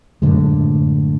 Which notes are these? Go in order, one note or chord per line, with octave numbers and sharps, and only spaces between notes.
F#2 A2 D3 G#3